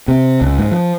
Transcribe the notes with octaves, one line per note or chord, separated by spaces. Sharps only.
C3
C#2
G#2
F3